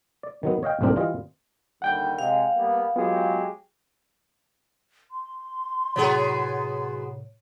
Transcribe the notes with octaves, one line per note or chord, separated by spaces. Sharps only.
D5
D#3 F#3 B3
C#5 D#5 F5 G5
B1 A2 A3 C4 D4 A#4
E3 G3 F4 D#5
D#2 D3 G3 F#5 G5 G6
C3 G#3 F5
G3 A#3 B3
F#3 G#3 B3 F4 G4 G#4
C6
A2 C3 F#3 B3 G#4 C#5